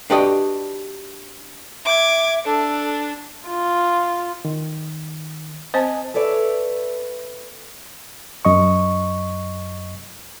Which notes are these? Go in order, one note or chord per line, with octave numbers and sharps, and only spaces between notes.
D4 F#4 G4 B4 D5 D#5
E5 D6 G#6
D4 A4
F4
D#3
C4 C5 D#5 G#5 A5
A4 B4 C#5 D5 E5
F#2 D#5 C#6